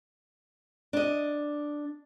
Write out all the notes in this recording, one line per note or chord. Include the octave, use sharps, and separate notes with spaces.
D4 D#5